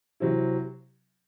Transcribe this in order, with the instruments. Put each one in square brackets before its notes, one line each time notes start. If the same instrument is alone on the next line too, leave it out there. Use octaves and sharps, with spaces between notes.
[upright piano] C3 F#3 C4 E4